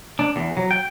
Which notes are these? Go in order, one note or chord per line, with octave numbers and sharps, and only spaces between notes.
D4
E2
F#3
G5